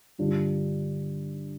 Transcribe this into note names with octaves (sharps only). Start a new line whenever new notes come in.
G2 D3 G3 D4 F4